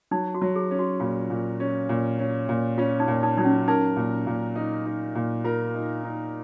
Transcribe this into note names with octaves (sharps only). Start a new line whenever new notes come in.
F#3 D#4
F#4
F#3
G#4
C#4
F#4
A#2 F4
A#2
C#4
A#2
C#4
A#2
C#4 F4
D#4
A#2
D#4
F#3 D#4
C#4
D#4 A#4
A#2
A#2
D#4
D#4
A#2
F4 A#4
D#4
D#4